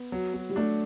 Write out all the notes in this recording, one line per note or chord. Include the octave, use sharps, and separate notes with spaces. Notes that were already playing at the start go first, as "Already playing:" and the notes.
Already playing: B3
F#3
F#3
G3
A3 D4